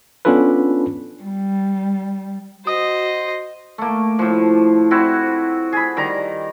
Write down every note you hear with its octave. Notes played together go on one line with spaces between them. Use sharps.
B3 C#4 D4 F4 A4 B4
G3
F#4 C5 D#5 D#6
A3 A#3
A2 F3
C4 E4 F#4
G#4 B5
D#3 G3 A#5